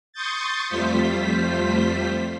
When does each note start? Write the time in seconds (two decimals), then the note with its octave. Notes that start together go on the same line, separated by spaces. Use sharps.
0.13 C6 C#6 D#6 G6 A6
0.68 F2 G3 A3 F4 C5 B6